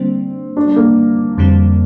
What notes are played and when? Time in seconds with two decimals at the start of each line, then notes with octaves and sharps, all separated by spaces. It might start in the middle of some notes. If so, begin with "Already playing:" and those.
Already playing: D3 G3 A#3 C4 D4
0.57 D4
0.67 D4
0.76 A#3
1.37 F2 D3 G3 C4